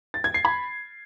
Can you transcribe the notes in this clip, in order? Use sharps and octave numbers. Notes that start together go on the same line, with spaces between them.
A6
G#6
C7
B5